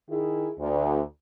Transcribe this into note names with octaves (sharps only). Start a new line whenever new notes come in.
D#3 E4 G#4
D2